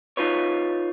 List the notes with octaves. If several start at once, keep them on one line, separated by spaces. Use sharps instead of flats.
D#4 F4 B4 C#5